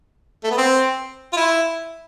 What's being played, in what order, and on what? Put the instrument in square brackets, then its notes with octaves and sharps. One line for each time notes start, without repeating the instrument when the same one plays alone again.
[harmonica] A3
B3
C4
F4
E4